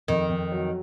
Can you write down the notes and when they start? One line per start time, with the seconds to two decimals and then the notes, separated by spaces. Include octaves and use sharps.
0.08 F2 D#3
0.29 F2
0.52 F#3